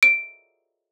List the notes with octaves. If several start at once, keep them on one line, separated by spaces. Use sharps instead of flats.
D7